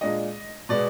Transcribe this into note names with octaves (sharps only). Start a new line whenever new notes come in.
A#2 G#3 D4 D#5
B2 G#3 B3 D5